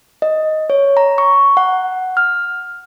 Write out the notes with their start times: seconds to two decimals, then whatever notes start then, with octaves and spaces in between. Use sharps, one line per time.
0.22 D#5
0.70 C#5
0.97 A#5
1.18 C#6
1.57 F#5
2.17 F6